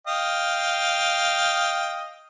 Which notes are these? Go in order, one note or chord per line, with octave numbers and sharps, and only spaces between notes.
D#5 F5 G5